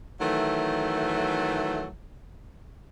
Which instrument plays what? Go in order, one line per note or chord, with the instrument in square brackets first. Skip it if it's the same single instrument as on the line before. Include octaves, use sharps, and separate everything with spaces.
[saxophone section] D#3 E3 F#3 A3